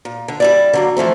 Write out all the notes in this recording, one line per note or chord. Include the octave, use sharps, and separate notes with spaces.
A#2
D3
G3 E4 D5
D3 F#3 A#3
E3 F3 A3 C4